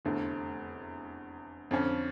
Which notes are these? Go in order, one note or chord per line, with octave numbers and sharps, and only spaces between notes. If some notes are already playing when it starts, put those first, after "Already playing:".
F1 E2 D3 A3
F2 D3 F3 C#4